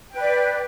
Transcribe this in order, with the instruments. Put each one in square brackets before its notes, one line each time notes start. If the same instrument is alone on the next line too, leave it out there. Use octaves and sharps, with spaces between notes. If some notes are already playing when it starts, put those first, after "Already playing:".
[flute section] G5
B4
D5